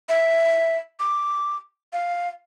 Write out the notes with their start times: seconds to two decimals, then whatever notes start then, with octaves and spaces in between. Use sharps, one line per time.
0.09 E5
0.99 D6
1.93 F5